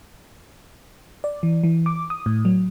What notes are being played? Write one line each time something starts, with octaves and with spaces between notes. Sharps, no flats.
D5
E3
E3
D6
D#6
A2
F#3